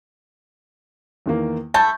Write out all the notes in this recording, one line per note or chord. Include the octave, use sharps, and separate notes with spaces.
E2 D#3 A#3
A3 A5 B5 G6